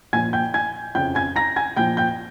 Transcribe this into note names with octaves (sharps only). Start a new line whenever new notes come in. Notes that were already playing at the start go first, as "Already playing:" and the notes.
A#2 F3 G#5 G#6
G5 G6
G#5 G#6
F2 C#3 F3 G5 G6
G#5 G#6
A#5 A#6
G#5 G#6
A#2 F3 G5 G6
G5 G6